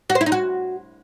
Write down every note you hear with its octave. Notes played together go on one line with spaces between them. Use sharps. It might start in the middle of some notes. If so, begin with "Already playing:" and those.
F#4
C5
E4
D#4
F#4